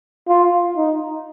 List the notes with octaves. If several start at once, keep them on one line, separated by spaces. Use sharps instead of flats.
F4
D#4